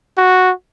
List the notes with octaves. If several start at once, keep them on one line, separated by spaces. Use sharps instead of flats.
F#4